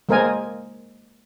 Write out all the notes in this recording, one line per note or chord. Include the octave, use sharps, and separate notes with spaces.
G#3 A#3 A#4 C5 D#5 G#5